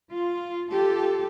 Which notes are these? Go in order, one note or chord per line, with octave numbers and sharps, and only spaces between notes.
F4
F4 G4 A4